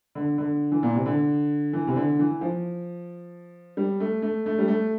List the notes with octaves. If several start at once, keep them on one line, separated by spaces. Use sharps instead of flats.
D3
D3
E3
A#2
C3
D3
E3
C3
D3
E3
F3
G3
A3
A3
A3
G3
A3